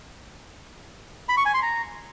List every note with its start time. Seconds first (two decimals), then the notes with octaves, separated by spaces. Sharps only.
1.29 B5
1.37 C#6
1.46 G#5
1.54 C6
1.62 A#5